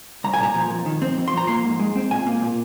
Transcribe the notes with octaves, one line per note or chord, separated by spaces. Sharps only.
C2 A#5
G#5
A#2 A#5
F3
F2
D#3
C4
F2
C6
F3 A#5
A#3 C6
G#2
G#3
C4
A#2 G#5
A#3
A#2